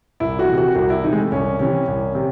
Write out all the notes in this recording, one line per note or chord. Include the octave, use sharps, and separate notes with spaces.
C2 E4
F#4
E3
C3 F#4
C2 F#4
E4
C3 E3 D#4
G#3
A3
C2 C#4
C3 E3 C#4
C2
C3